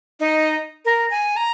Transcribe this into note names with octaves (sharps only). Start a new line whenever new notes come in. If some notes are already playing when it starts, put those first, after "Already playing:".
D#4
A#4
G#5
A#5